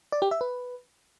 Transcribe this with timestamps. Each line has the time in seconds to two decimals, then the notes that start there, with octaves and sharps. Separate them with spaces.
0.12 D5
0.22 G4
0.31 E5
0.41 B4